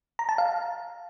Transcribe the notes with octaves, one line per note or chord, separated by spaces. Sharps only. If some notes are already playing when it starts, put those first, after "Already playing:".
A#5
A5
F5